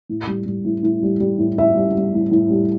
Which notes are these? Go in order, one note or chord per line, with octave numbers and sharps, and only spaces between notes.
A2
G3
G3
A2
A2
G3
G3
A2
A2 E5
G3
G3
A2
A2
G3